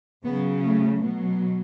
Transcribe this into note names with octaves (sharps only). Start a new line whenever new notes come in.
C#3 F#3 B3
A3
B2 F#3